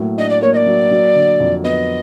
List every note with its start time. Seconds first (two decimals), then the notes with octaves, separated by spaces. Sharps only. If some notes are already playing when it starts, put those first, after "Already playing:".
Already playing: A2 F#3 A#3
0.18 D4 D#5
0.29 D5
0.42 A#3 C#5
0.53 D#5
0.56 D5
0.66 F#3
0.91 F#3
1.15 D3
1.40 F2
1.64 B3 D#5